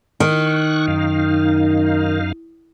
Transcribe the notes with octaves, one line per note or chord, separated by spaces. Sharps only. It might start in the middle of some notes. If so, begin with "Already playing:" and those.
D#3 C#6 F#6
F#2 D#4 F5